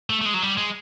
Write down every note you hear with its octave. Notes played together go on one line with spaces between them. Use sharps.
A3
A3
G#3
F#3
G3
G#3